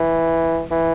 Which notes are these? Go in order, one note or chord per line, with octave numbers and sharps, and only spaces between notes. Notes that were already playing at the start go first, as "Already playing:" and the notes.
Already playing: E3
E3